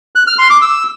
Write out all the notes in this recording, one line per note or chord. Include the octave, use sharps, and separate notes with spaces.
F#6
F6
C6
D6
E6